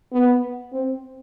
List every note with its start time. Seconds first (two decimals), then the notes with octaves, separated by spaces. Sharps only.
0.12 B3
0.72 C4